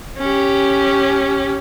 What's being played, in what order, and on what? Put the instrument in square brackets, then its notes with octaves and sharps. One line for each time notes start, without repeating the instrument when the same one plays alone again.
[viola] C#4 G4